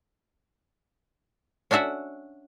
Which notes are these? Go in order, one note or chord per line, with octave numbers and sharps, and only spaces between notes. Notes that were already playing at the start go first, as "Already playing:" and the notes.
C#4 D4 F#4 E5 F#5